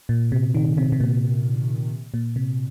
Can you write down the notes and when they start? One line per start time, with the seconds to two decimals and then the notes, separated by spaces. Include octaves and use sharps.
0.09 A#2
0.32 C3
0.55 D#3
0.77 C3
0.92 C3
1.00 A#2
2.14 A#2
2.36 C3